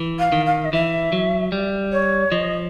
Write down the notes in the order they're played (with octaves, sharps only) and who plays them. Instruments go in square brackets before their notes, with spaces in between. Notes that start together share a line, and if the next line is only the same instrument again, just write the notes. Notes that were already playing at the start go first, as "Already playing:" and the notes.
Already playing: [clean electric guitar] E3
[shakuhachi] F5
[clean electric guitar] D#3
[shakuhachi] F5
D#5
[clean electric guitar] E3 [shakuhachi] E5
[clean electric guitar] F#3
G3
[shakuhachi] C#5
[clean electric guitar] F3 [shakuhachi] D#5